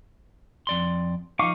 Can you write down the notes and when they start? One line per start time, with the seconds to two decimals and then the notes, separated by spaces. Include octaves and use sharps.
0.67 F2 D5 C6
1.39 F3 D#4 F5 C#6 D6